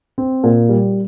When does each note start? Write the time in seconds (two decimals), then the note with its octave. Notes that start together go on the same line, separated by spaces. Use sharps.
0.18 C4
0.44 A#2
0.69 G3